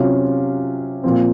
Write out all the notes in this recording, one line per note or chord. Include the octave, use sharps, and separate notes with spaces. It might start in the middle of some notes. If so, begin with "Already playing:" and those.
Already playing: C3 F#3 C#4 F4
A#2 F3 C4